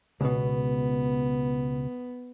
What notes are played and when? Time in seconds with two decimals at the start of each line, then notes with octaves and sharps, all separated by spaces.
0.21 C#2 B2 B3